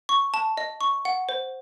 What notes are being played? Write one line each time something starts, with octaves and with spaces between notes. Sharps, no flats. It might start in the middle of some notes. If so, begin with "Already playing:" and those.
C#6
A5
D#5
C#6
F#5
C5